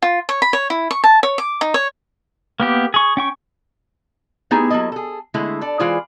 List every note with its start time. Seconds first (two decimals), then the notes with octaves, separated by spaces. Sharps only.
0.02 F4
0.29 C#5
0.42 B5
0.53 C#5
0.70 E4
0.91 C#6
1.04 A5
1.23 C#5
1.38 D6
1.61 D#4
1.74 C#5
2.60 A#3 B3 G4
2.94 G#4 C#6
3.17 C#4 G5 C#6
4.51 A3 B3 D#4 E4 G4 G#4
4.70 F#3 A#3 E4 A4 D#5
4.92 G#4 A4
5.34 D3 G#3 A3 E4
5.61 A4 D5
5.79 E3 G#3 F4 G#4 C5 D5